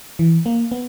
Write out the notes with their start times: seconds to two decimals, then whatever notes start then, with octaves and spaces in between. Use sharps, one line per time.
0.19 E3
0.46 A#3
0.72 B3